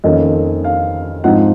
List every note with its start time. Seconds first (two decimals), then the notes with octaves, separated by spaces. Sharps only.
0.04 F2 D#3 A#3 C#4 D#5
0.64 F5
1.24 G#2 F3 C4 D#4 F#5